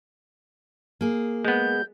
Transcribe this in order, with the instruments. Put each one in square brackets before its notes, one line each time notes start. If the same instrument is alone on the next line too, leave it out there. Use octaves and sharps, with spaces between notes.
[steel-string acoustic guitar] A#3 G#4
[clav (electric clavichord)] G#3 B3 [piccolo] G6